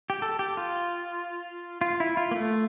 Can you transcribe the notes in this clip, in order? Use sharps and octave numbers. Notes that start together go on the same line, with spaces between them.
G4
A4
G4
F4
F4
E4
F4
A#3
A3